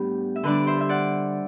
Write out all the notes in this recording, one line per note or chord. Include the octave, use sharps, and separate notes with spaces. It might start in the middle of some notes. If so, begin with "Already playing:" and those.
Already playing: A2 G3 B3 D4 G4
E5
D3 G3 D4 B4 D5
C5 E5
E5
D5 F#5